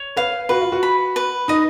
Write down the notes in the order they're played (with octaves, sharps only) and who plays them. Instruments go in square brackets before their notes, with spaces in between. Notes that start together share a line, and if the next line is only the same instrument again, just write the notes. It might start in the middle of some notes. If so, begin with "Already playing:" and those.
Already playing: [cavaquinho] C#5
[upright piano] B4 [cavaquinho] F5
[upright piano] F#4 [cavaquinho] B4
[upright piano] F4
F#4
[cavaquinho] B5
B4
[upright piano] D#4 [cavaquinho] D#5